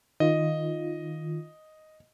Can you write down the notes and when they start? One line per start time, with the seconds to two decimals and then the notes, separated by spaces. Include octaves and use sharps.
0.20 D#3 F4 D#5